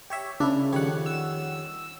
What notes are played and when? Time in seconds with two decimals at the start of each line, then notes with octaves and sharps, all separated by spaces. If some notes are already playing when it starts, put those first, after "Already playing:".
0.10 G4 C#5 E5
0.40 C#3 D4 E4 A#4
0.73 F2 D#3 G3 C#5 F#5
1.06 E6